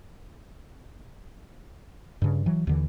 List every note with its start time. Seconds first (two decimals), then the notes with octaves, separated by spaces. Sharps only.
2.22 G2 C#3
2.46 E3 F#3
2.67 D#2 D3 E3